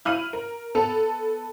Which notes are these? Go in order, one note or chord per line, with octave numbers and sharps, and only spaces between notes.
E4 F6 D#7 F#7
A#4
B3 A4 A5 F7